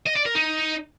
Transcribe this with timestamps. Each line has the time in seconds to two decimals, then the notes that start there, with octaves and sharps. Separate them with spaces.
0.06 D#5
0.16 D5
0.25 A#4
0.35 D#4